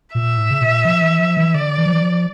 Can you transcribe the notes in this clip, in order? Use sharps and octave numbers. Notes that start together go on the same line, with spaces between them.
A#2 E5
A2
C#3
A#2
F3
E3
F3
E3
D3 D5
E3
F3
E3
F3